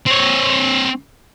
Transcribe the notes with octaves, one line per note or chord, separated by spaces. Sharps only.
C4 C#5